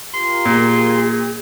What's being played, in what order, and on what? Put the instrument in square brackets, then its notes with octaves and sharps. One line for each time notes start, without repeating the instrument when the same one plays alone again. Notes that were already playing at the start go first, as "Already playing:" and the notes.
[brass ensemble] F4 G4 A#4 [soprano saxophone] C6
[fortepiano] A#2 [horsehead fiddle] G#4